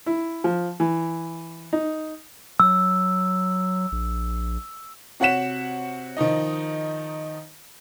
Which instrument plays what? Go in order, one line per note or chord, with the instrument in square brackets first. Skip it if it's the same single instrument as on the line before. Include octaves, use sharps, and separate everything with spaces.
[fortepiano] E4
F3
E3
D#4
[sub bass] F#3 [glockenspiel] E6
[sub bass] A#1
[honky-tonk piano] C3 F#4 C#5 F#5 B6 E7
D#3 F3 D#4 D#5